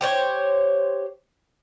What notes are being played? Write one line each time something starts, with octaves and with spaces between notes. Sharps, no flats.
G4 C5 C#5